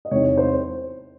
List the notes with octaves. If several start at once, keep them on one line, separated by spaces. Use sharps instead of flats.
D#5
E2 C3 E3 C4 D#4 C#5
C#5
C5